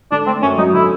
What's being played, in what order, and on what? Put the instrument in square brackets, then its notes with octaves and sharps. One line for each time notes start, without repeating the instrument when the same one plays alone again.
[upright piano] D3 [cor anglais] D4
[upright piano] A3 [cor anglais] C4
[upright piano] F#2 [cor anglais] C#4
[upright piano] F#3 [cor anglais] D#4
[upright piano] D3 [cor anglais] E4